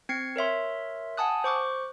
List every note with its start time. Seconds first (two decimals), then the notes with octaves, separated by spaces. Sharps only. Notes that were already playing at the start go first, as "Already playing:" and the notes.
0.09 C4 G#6 C7 C#7
0.36 A#4 C#5 E5 C6
1.17 F#5 G#5 A5 D#6 F#6
1.44 C5 C#6 D6 F#6